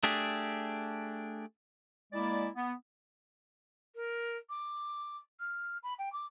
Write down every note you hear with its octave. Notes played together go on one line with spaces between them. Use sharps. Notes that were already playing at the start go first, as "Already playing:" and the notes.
A3 D4 G4 G#4
G#3 A#3 E4 D5
B3
A#4
D6
F6
B5
G5
D6